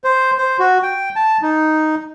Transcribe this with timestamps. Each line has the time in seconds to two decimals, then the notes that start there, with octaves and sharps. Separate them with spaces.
0.04 C5
0.38 C5
0.59 F#4
0.83 G5
1.16 A5
1.42 D#4